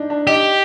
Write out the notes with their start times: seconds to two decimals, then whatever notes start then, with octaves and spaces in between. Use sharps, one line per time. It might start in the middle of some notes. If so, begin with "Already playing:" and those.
Already playing: D4 D#4
0.10 D4
0.27 D#4 G4